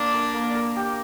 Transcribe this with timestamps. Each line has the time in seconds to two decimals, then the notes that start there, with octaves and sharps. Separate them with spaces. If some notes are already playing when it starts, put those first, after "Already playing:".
Already playing: A#3 D4
0.14 A#4
0.34 A#3
0.55 A#4
0.76 G4